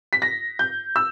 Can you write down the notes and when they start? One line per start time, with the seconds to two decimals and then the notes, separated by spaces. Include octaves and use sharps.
0.13 B6
0.22 A#6
0.59 G6
0.96 E6